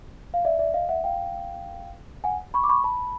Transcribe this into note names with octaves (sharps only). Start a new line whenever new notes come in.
F5
D5 E5
D5 E5
D#5 F5
E5 F#5
F5 G5
F#5 G#5
B5 C#6
D6
B5 C#6
A5 B5